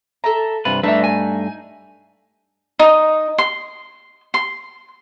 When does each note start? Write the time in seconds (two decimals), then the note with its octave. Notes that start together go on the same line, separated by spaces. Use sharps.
0.24 A4 E5 A#5
0.65 G2 C3 F4 B4
0.83 G2 A3 D4 D#4 B4 E5
1.04 G#5
2.79 D#4
3.38 C6
4.34 C6